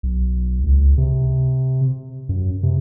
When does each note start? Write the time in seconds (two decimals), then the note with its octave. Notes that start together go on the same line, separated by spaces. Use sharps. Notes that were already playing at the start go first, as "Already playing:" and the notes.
0.03 B1
0.64 C#2
0.98 C3
2.29 F#2
2.63 C3